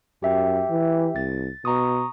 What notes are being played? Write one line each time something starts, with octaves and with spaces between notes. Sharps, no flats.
F#2 G4 E5 G5
E3
C2 A6
B2 A#5 C#6 D#6